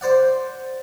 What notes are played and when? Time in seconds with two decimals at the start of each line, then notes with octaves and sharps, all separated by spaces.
0.01 C5 D5 F#5